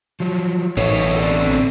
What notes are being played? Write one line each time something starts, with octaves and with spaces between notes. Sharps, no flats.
F3 F#3
A1 B2 A3 D#4 A#4 C5 C#5
C4 A4 D5